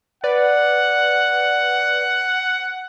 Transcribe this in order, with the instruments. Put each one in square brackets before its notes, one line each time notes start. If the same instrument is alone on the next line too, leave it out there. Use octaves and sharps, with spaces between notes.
[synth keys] B4 D5 [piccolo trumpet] F#5